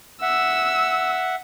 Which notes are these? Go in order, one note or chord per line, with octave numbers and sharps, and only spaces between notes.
E5 F#5 E6